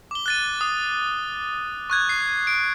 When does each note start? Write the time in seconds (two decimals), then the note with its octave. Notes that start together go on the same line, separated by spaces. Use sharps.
0.11 D6 G7
0.26 F#6 A6 D#7
0.61 D#6
1.90 C#6 F#6 G#6
2.09 C7
2.47 D7